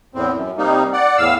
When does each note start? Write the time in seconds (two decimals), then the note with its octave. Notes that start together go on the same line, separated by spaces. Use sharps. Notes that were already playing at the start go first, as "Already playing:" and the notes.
0.15 E2 A2 C4
0.34 F#2
0.58 C3 G3 A#3 D#4
0.93 D5 F#5
1.18 E2 A2 F5 E6